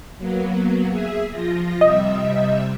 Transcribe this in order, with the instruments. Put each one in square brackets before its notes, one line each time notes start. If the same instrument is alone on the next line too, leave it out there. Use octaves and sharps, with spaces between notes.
[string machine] F#3 A#3 B3
G#4 E5
F3 F4 A#6
[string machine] C3 G3 E5 [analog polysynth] D#5